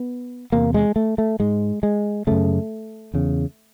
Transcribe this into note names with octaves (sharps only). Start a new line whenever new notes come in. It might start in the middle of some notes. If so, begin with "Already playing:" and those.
Already playing: B3
E2 C3 A#3
G#3
A3
A3
G#2 G#3
G#3
F#2 C#3 A3
E2 C#3